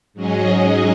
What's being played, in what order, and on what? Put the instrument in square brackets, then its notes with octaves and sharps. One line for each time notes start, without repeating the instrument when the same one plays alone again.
[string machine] G#2 F#3 C#4 G#4 D#5